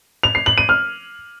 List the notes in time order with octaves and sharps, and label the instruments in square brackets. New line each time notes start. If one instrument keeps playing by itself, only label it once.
[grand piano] F7
C7
F#7
D#7
F6